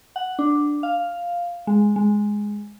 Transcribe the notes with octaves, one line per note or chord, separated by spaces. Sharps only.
F#5
D4
F5
G#3
G#3